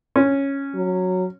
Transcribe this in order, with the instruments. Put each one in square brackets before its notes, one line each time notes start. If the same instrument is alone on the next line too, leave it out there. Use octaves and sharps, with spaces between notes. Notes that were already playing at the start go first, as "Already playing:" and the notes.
[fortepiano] C#4
[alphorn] F#3